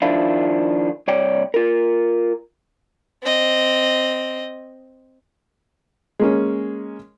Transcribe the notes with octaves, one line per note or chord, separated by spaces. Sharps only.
D#3 F3 D4 E4 F4
C2 C#5 D5 G5
F4 A#4
C4 D#5
G#3 A#3 C#4